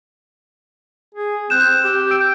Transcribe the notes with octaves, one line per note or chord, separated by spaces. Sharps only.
G#4
C4 F#6 G6 E7
G4
E6 G6 D7